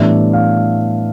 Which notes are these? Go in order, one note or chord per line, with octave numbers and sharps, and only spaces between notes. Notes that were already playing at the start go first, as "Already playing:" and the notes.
Already playing: A2 E3 G3 B3 D4 E5
F5